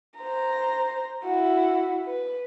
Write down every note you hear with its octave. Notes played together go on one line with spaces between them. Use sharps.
C5 A#5
E4 F#4
B4